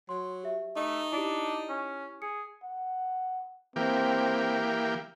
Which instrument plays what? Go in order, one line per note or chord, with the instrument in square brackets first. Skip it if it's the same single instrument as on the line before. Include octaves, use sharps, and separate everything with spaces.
[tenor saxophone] F#3 [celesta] C6
[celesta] G4 E5
[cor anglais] A3 [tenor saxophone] D#4
[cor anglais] D4 [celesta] E4 G4
[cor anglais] C#4
[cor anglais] G#4 [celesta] C#7
[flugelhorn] F#5
[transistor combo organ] E3 A#3 G4 [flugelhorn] C4